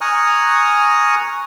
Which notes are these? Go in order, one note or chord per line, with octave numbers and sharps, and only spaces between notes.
G#5 A#5 C#6 D#6 F6 F#6